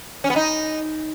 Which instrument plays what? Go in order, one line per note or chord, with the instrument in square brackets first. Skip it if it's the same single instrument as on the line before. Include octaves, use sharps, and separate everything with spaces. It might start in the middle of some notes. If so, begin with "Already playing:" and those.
[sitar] C#4
B3
D#4